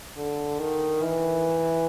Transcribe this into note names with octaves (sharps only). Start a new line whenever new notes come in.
D3
D#3
E3